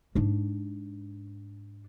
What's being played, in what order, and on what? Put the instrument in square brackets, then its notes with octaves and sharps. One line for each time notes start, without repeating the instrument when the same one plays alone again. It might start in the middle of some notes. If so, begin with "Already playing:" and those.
[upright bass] G#2 D4